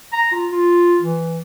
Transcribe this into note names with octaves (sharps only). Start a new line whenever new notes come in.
A#5
F4
F4
E3